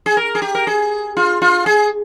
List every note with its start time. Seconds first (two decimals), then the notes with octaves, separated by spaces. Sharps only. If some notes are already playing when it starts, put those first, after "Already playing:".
0.06 G#4
0.17 A#4
0.35 G#4
0.42 G4
0.55 A#4
0.67 G#4
1.17 F4
1.42 F4
1.66 G#4